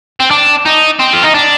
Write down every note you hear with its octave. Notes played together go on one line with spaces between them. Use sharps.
C4
D4
D#4
C4
F4
D#4
D4